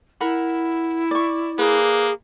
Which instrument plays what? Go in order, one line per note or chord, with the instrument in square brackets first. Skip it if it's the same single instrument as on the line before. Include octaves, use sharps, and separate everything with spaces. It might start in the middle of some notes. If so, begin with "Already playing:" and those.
[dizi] E4 [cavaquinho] A#4 F#5 B5
[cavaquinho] D5 C#6
[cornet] A#3 [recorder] G#4 [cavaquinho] B4 D5